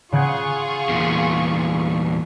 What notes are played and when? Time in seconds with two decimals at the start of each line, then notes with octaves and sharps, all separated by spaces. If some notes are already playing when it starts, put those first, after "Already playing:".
0.13 C#3 F4 G#4 F#5 C#6 G#6
0.89 E2 A#2